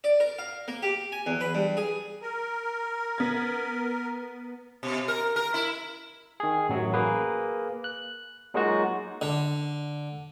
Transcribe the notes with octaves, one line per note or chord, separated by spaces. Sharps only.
D5
A#4
F5
A#3
G4
G#5
E2
B4
G2
G#4
A#4
B3 G#6
B2
A#4
A#4
E4
D#3 G#4
A1 F#2 F#3 F#4
A#3 G#4 B4
F#6
F#3 G#3 A#3 D#4 F4 F#4
D3